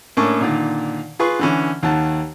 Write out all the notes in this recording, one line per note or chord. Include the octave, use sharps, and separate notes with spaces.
A2 A#3 C#4 D4 C#6
A#2 D3 D#3
F4 G#4 B4 C#6
D3 E3 C#4
D#2 D#3 F#5 A5